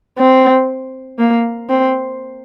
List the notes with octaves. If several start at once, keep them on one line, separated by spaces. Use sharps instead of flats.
C4
A#3
C4